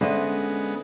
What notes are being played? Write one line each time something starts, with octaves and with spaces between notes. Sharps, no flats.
D3 G#3 B3 C#4 C5 D#5 E5